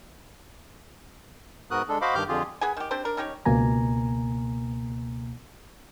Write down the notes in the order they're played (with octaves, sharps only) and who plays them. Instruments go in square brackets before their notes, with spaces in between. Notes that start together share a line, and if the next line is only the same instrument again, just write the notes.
[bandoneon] G#2 B3 F#4 A#4 D#6 F#6
G#3 D4 A4
F#4 C5 D#5 F5 B5 D6
G2 D#3 G4 D6 F6 G6
F2 D3 F4 G4 G#4
[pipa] B3 G#4 G#5
D#3 G4
C4 D4 G4 C5
D4 A#4
C#4 D#4 G4 C#5
[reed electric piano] C#2 B2 A#3 G#5 A#5